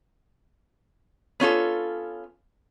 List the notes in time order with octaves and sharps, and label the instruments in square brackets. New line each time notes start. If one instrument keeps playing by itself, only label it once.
[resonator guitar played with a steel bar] B3 C#4 F4 A4